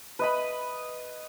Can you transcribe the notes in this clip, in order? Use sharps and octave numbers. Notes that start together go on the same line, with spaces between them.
B4 D#5 B5